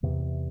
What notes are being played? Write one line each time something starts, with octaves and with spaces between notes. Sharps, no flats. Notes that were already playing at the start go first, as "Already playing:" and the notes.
E2 C3 E3